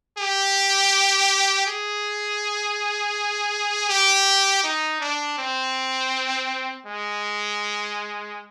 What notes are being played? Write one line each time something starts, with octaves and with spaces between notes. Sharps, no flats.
G4
G#4
G4
D#4
D4
C4
G#3